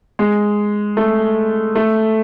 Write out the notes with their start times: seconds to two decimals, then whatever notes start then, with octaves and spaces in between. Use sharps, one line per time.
0.19 G#3
0.97 A3
1.75 A3